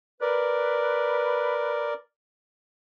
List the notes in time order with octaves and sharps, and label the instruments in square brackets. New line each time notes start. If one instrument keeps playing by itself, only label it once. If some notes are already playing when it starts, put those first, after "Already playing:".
[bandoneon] A#4 D5 [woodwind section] B4